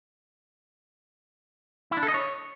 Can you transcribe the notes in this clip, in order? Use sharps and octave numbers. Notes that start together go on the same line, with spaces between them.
E4
D4
A4
D#5
C#5